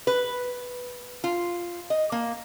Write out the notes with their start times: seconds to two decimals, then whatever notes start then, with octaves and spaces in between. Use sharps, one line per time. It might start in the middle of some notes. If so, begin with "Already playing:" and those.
0.07 B4
1.24 F4
1.90 D#5
2.12 A#3